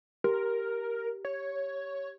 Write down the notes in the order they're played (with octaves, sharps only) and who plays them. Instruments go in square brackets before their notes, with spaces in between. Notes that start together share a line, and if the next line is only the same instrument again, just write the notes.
[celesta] G4 [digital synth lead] A#4
[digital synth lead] C#5